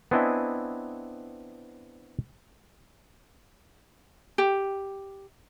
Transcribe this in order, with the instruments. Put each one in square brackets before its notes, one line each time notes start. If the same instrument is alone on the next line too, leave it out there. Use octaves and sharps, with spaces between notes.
[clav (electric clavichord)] B3 C4 D4 E4 D#5 G#5
[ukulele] G4